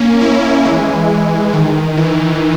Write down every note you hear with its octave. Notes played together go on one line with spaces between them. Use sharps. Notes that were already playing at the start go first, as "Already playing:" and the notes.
Already playing: A#3 C#4
C#4 E4
E3 G#3
D#3
E3